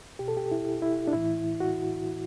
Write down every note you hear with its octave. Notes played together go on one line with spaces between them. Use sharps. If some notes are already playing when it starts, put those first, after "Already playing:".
B2 G4
A4
G4
E4
E4
D4
A2 E3 E4
F#4